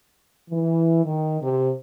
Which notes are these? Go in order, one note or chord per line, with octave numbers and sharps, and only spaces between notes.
E3
D#3
C3